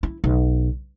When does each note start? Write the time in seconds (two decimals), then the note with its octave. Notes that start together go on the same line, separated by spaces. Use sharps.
0.03 E4
0.24 B1